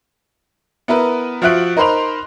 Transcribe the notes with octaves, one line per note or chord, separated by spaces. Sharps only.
B3 E4 A#4 B4
F3 F4 F#4 E5 F#6 D7
D#4 A#4 C5 B5 C6 F7